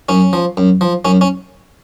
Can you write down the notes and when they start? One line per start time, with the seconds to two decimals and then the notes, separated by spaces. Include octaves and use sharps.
0.09 F#2 C#4
0.33 F3
0.57 F#2
0.81 F3
1.05 F#2 C#4
1.21 C#4